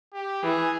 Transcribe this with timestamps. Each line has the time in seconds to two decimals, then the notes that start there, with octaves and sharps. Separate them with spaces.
0.14 G4
0.43 E3 G#4